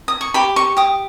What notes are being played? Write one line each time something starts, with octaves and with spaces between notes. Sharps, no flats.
D#6
C#6
G4 B5
C#6
G4 D#6